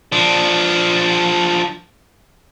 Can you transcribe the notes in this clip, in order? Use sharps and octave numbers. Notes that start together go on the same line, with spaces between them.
F3 D4